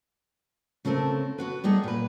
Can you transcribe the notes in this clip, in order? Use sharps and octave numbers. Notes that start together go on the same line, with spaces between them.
C#3 A3 C4 A4 A#4
B3 F#4 B4
G3 A3 B3 D#4 G#4 D#5
A#2 B4